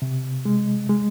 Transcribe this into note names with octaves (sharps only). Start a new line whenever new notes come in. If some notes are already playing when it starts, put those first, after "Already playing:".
C3
G#3
G#3